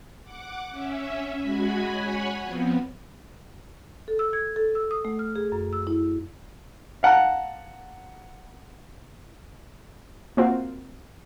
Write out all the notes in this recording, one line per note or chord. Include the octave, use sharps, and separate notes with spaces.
F#5 D6
C#4 E5
G#3 F#4 G#5 B5
C#5 F#5 G#5 B5
F3 B3 C4
A4
E6
G#6
A4
E6
D#6
A3
F6
G#4
F#2
E6
E4
F5 F#5 A5 A#5
A#3 C4 F4 F#4